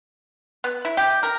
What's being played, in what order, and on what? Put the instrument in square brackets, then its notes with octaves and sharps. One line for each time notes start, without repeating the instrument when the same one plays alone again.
[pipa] B3
E4
G4
A#4